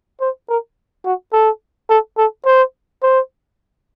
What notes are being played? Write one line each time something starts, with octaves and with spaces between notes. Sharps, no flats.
C5
A#4
F#4
A4
A4
A4
C5
C5